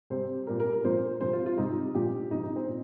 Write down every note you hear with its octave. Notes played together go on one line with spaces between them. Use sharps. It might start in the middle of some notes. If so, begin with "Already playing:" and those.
C3 G3 C5
A#2 G3 A#4
A#4
A#4
A#2 F3 C5
C3 F3 C5
F4
F4
C3 G3 D#4
A#2 F3 G4
C3 F3 D#4
D#4
C4
A#2